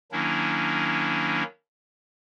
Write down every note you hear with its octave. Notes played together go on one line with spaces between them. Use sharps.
D#3 F#3 A#3 C#4 D4 E4